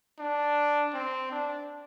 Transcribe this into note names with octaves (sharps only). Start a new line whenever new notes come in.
D4
C4
D4